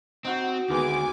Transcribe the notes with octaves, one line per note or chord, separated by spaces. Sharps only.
C4 D#4 F#4 C#6
D2 D#3 G#3 B3 G#5 D6